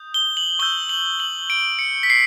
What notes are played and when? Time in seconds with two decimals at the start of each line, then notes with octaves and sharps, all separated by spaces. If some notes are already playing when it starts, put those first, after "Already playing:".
Already playing: D#6 G6
0.14 G7
0.37 F#7
0.59 C#6 E6 G6 G7
0.89 F#7
1.20 F#7
1.50 D7
1.79 C#7
2.03 B6
2.10 C7